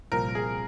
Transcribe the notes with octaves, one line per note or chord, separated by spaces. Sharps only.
C2 A#2 F3 C4 A#4
G#4